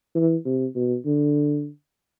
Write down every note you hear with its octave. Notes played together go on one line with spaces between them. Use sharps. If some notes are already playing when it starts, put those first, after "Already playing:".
E3
C3
B2
D3